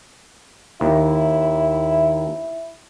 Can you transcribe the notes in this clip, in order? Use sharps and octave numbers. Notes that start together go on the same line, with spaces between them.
D#2 E4